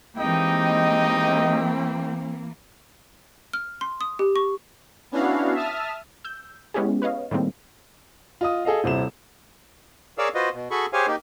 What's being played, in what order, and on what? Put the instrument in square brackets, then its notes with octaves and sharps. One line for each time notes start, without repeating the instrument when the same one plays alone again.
[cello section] E3 A#3 [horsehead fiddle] G#3 G5 [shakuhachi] C4 [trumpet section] D#4 G4 D#5
[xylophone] F6
C6
D#6
G4
C#6
[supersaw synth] B3 C#4 D4 E4 F#4 F5
E5 A5 D#6 F6
[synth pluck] E6 G6
G#3 B3 C#4 E4 G4 G#4
B4 C#5 D#5 F5
A2 D#3 G3 G#3 A#3 C4
[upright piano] F4 D#5 D#6
G#4 A4 D#5 F5
D#1 C3 E4 E7
[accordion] G#4 A#4 C#5 D5 F5 E6
F4 F#4 B4 C5 D#5
B2
F#4 G#4 A4 B5 C#6
G4 G#4 C5 C#5 F5 G#5
A#3 D#4 G4